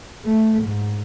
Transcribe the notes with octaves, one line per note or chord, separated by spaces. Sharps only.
A3
G#2